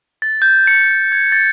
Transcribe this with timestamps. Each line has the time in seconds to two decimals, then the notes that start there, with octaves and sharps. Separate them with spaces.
0.22 A6
0.42 G6
0.67 C#7
1.12 G#6
1.32 A6